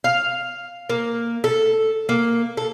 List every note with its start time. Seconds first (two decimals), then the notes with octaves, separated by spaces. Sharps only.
0.04 F5
0.89 A#3
1.44 A4
2.09 A#3
2.57 A4